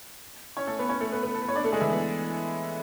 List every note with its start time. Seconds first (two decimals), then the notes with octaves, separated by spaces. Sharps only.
0.57 C#4 C#5
0.67 A3 A4
0.79 B3 B4
0.89 C#4 C#5
1.00 A3 A4
1.12 B3 B4
1.23 B3 B4
1.35 A4
1.42 B4
1.49 C#5
1.56 D4 D5
1.64 A3 A4
1.72 G#3 G#4
1.81 E3 E4
1.90 B3